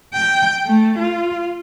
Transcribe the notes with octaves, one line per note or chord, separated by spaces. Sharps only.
G5
A3
F4